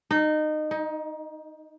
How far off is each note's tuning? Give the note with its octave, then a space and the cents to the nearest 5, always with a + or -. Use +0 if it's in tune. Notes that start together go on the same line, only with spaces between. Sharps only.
D#4 -20
D#4 +20